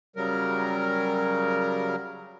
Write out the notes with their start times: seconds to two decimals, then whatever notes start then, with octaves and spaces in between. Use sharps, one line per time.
0.16 C#3 F#3 G3 A#4